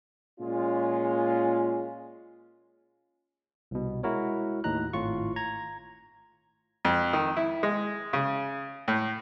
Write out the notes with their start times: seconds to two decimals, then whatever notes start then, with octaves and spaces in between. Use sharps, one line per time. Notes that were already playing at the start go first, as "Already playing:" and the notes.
0.40 A#2 G#3 C#4 F4
3.71 C2 B2
4.03 G#3 E4 F#4 A#4 C#5
4.64 D#2 A2 D#4 A#5 F#6
4.93 G#1 A2 F4 C#6
5.36 A#5 G#6
6.85 F2
7.13 D#3
7.37 E4
7.63 G#3
8.13 C#3
8.88 A2